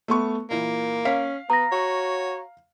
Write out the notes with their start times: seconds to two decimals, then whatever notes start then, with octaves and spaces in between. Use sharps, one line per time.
0.08 A3 B3 C#6
0.51 A#2 E3 A#3
1.05 C#4 F5 B6
1.50 B3 A#5 A#6
1.72 F#4 C#5